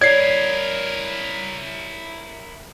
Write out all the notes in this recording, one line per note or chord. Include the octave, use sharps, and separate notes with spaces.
E4 A#4 C#5 D5 G#6 C7